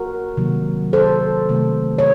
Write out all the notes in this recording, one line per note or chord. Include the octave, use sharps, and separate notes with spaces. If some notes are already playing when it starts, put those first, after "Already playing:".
Already playing: F#4 A#4
C3 D#3 F#3 A#3
A4 C5
C3 D#3 A3
C#5